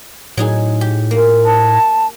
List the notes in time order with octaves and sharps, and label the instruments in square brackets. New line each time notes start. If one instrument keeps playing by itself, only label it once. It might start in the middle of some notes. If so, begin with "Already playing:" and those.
[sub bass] A2 [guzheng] F#3 D#4 G#4
[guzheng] G4
A#3
[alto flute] A5